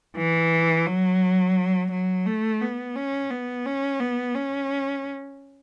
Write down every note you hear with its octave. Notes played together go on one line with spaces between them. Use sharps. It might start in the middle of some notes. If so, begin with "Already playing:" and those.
E3
F#3
F#3
A3
B3
C#4
B3
C#4
B3
C#4